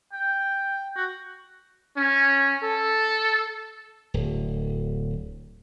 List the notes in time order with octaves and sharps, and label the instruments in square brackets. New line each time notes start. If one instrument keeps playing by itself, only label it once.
[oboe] G5
F#4
[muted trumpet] C#4
A4
[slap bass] D1